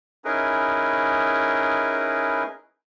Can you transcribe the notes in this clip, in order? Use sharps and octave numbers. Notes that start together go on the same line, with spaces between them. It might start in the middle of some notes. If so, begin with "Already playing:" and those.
C#4 D#4 E4 G#4 A#4 B4